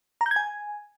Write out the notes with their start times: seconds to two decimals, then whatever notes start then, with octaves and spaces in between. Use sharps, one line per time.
0.21 A#5
0.26 G6
0.31 G#6
0.36 G#5